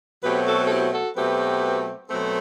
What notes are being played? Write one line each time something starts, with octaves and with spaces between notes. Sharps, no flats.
B2 F#3 A3 C4 G4 B4
F#4 A4
A4
E4 G4
F#4 A4
B2 F#3 A3 C4 G4 B4
B2 F#3 A3 C4 A4 C5